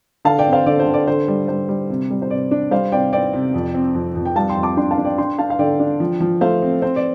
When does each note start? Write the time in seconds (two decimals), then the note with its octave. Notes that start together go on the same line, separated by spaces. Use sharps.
0.25 D3 F5 A5
0.39 D5 G5
0.46 C4
0.53 C5 F5
0.66 D3 D5
0.80 C5
0.86 D3
0.94 D5
1.07 D3 C5
1.28 G3
1.48 G3 C5
1.69 G3
1.90 C3
2.10 G3
2.22 C5
2.30 C3 D5
2.51 D4
2.71 G3 C5 F5
2.92 C3 D5 G5
3.13 C4 D5 G5
3.33 C3
3.54 F2
3.74 C4
3.94 F2
4.15 F2
4.25 G5
4.36 G3 F5 A5
4.50 G5 C6
4.57 F2
4.63 A5 D6
4.77 D4 G5 C6
4.91 F5 A5
4.98 D4
5.05 D5 G5
5.18 D4 G5 C6
5.39 D4 F5 A5
5.50 F5
5.59 D3 D5 G5
5.80 D4
6.00 F3
6.20 F3
6.41 A3 C5 F5
6.62 C4
6.82 C4 C5
6.96 D5